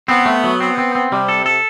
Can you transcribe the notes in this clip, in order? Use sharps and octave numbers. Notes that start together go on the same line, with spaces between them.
B3 C4
A3
F#3
B3 C4
C4
C4
C3 G3
A4
A4